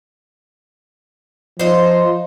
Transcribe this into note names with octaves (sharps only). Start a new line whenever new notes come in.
F3 D#4 C5